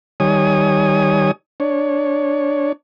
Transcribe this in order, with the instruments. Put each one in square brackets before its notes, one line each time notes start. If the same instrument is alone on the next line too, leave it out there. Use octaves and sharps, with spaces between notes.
[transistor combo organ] D#3 G3 C#5 G#5 D#6
D4 C#5